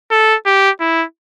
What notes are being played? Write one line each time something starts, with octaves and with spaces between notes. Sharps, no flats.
A4
G4
E4